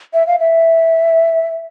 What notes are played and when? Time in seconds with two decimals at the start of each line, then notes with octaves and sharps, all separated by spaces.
0.14 E5
0.27 F5
0.39 E5